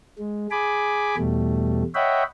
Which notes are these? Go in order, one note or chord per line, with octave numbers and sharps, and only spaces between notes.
G#3
G#4 G#5 B5 D6
E2 B2 G3 A3
C#5 D#5 E5 F#5 G5 B5